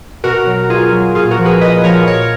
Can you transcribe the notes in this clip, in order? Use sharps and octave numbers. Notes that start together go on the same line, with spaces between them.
B2 F#4 A#4
F#3
B2 F4 G#4
F#3
A#2 F4 G#4
F#4 A#4
F3
G#4 B4
A#2 B4 D#5
F3 A#4 C#5
A#2 A#4 C#5